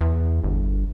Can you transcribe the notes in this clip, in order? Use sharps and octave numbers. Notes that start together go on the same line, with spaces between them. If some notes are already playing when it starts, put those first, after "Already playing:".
E2
G1